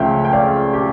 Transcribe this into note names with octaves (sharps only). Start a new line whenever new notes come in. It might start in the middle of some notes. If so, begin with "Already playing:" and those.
Already playing: C#2 C#3 F3 A3 C#4 E5 F5 G5
G5
D5 F5
G4